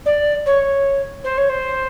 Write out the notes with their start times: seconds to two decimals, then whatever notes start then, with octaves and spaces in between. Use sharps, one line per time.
0.06 D5
0.46 C#5
1.24 C5
1.37 C#5
1.49 C5